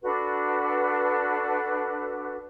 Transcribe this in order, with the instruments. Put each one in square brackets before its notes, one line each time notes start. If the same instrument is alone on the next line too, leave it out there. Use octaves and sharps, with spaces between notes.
[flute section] D4 F#4 A4 B4